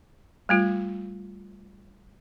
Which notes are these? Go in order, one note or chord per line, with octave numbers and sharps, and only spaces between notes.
G3 A3 F4